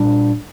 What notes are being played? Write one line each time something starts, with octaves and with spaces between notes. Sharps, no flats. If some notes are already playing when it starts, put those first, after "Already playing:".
Already playing: A#2 G3 D4